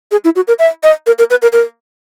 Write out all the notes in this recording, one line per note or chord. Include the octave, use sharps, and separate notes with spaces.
G#4
E4
F#4
A#4
E5
D#5
A#4
A#4
B4
A#4
A#4